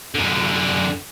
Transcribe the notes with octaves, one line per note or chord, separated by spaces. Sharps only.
F#2 D3